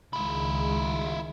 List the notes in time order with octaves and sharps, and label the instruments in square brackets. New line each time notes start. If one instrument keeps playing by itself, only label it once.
[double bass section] C#2 D#3 G#3 [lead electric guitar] E4 F4